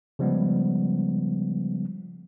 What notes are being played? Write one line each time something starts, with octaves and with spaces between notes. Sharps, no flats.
C#3 F3 G3 G#3 B3